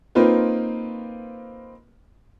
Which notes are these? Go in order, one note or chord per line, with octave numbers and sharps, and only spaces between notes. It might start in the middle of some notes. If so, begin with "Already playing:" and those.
A#3 C4 D#4 F4 B4